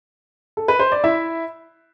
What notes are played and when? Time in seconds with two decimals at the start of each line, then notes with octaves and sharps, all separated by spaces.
0.57 A4
0.68 B4
0.79 C5
0.92 D5
1.04 E4 E5